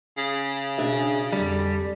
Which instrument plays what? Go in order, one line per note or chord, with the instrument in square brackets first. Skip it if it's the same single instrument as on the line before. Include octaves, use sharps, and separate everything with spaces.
[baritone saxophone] C#3
[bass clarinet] B2 [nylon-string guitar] D4 G#4 E5
[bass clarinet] F2 [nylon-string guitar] D3 [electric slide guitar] G3